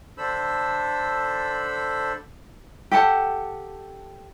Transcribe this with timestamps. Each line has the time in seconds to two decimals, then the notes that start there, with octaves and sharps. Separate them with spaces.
0.18 D3 D4 A4 C5 B5 E6
2.91 G4 A4 F#5 A5